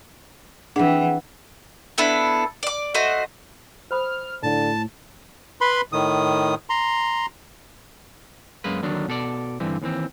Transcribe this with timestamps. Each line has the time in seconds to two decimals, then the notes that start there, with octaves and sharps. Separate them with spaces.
0.76 E3 C4 D4 G#4 F#5
1.98 B3 D4 E4 A4
2.63 D5 D6
2.95 A3 F#4 C5 D#5
3.91 C5 B5 D#6 F6
4.43 A2 D3 A5
5.61 B4 B5 C6
5.92 A2 D#3 D#6
6.70 A#5 C6
8.64 F#2 G#3 A#3 B4
8.83 D#2 D3 D#3 F#3 D4
9.08 B2 A4 D5
9.60 G2 D3 E3 C4
9.82 D#2 E3 C4